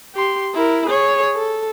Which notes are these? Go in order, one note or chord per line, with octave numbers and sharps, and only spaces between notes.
G4 C6
E4 A#4
G#4 C#5
A4